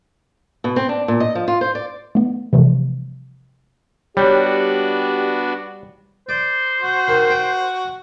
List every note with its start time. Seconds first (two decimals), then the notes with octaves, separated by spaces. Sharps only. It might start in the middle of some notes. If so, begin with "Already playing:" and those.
0.64 B2
0.76 C4
0.89 D4
1.08 A#2
1.20 D#5
1.35 F3
1.48 F4
1.61 C5
1.75 D5
2.15 A3 B3
2.53 C3 E3 F3 G3 A3
4.17 G3 B3 D4 F#4 G4 C#5 D6
6.29 C5 D5
6.81 F#4
7.08 D#3
7.30 G5